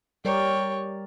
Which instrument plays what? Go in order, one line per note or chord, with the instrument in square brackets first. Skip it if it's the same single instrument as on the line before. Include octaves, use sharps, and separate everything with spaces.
[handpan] G3 A#4 D5 [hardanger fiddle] C#5 G5